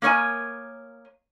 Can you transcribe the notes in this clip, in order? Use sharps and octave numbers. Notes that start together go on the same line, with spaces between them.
A#3 A#4 C#5 D#5 G#5